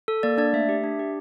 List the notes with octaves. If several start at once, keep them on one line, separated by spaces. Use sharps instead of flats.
A4
A#3 D5
D4 D5
A3 E5
G4
D4
G4